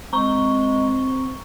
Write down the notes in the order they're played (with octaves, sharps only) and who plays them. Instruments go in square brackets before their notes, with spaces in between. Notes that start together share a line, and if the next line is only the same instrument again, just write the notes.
[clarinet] G#3 [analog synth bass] C4 [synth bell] A#5 C#6 G7